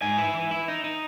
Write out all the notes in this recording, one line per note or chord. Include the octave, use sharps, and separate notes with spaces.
G#2 G#5
E4
E3
E4
D#4
D#4